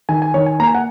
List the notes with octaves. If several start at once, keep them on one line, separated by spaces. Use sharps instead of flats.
D#3 G#5
G#5
D#3 C#5
G#5
A#3 A#5
G#5
F#5